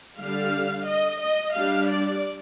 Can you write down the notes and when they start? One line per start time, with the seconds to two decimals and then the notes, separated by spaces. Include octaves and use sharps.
0.21 D3 G3 D4 F5
0.88 D#5
1.23 D#5
1.56 G3 D4 F5
1.89 D5